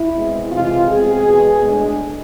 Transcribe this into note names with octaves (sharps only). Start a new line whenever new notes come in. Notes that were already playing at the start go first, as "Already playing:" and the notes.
Already playing: E4
B2 G#3 C4
E2 C3 E3 G#3 F4
B2 G#3 C4 G#4
E2 B2 G#3
A2 G#3 D4